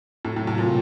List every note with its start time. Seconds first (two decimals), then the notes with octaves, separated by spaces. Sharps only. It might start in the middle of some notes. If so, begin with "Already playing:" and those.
0.25 A2 C3 F#3 A#3
0.36 A2
0.47 A2
0.58 A#2